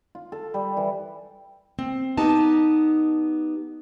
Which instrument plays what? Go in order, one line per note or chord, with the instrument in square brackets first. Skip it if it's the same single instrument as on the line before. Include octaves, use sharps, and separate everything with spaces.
[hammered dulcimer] F4
A4
G3
E3
[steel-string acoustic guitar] C4
B3 D#4 G4 A5